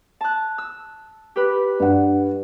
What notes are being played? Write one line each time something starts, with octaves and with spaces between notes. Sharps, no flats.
A5 F#6
E6
G4 B4
G2 F#5